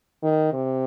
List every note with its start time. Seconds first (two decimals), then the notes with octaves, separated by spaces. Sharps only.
0.23 D#3
0.53 C3